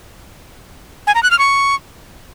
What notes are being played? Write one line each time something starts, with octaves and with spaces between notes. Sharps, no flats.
G#5
A#5
F#6
F6
C#6